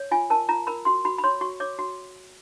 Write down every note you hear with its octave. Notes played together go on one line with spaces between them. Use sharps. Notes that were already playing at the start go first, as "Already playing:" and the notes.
Already playing: C#5
F4 G#5
A#4 A5
F4 A#5
A#4 B5
F#4 C6
F#4 B5
B5
C#5 C6
F#4 C#6
C#5 D6
F#4